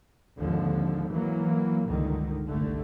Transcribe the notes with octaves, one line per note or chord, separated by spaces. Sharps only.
G#1 D#2 D3 F3
E3 F#3 A#3
C#2 G2 D3 D#3
G1 C2 D3 A3